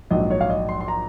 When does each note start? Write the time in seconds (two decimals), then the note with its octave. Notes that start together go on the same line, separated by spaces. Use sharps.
0.10 A#1 G#2 F#3 D#5
0.31 C#5
0.41 F5
0.50 D#5
0.69 C6
0.81 C6
0.88 A#5